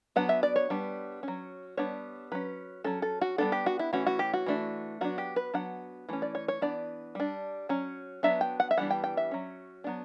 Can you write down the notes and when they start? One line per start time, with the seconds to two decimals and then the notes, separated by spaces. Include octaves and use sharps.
0.16 F#3 B3 D4 F#5
0.29 E5
0.43 D5
0.56 C#5
0.70 G3 B3 D4
1.23 F#3 C#4
1.77 G3 B3 D4 C#5
2.32 F#3 C#4 B4
2.84 F#3 C#4 A4
3.02 A4
3.21 F#4
3.38 G3 B3 D4 A4
3.52 G4
3.66 F#4
3.79 E4
3.93 E3 A3 C#4 F#4
4.06 F#4
4.19 G4
4.33 F#4
4.46 E3 A3 D4
5.01 F#3 B3 D4 F#4
5.18 G4
5.36 B4
5.54 F#3 B3 D4 F#5
6.09 E3 A3 C#4
6.22 D5
6.35 C#5
6.48 C#5
6.61 E3 B3 D4 D5
7.15 G3 D4
7.69 F#3 C#4
8.23 F#3 B3 D4 E5
8.41 G5
8.60 F#5
8.71 E5
8.77 E3 G3 B3 D4 F#5
8.90 G5
9.04 G5
9.17 E5
9.31 F#3 C#4
9.84 F#3 B3 D4